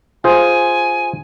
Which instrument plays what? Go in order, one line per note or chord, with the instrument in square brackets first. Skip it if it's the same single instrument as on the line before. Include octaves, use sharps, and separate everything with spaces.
[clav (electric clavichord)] F4 G#4 C5 [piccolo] G#5